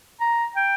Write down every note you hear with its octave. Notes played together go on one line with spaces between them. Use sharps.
A#5
G5